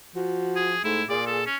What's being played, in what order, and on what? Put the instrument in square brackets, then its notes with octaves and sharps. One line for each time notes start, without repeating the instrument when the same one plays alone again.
[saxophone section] F3 F#4
[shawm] G#4
[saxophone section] G#2 A3 [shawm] E4
[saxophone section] A#2 G#4 [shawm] D5
[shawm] A4
C#4